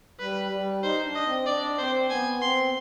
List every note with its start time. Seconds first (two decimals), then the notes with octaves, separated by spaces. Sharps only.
0.20 G3 B4
0.51 G3
0.83 D#4 C5
1.05 D4
1.15 D#5
1.26 C4
1.46 D4 D5
1.78 C4 C5
2.10 B3 G#5
2.42 C4 C6